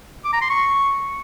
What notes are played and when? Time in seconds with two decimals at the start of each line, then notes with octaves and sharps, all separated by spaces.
0.25 D6
0.33 A#5
0.42 C6
0.50 C#6